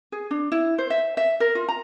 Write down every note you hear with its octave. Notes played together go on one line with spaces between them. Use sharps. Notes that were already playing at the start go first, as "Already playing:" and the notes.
G#4
D4
E4
C5
E5
E5
A#4
F4
A#5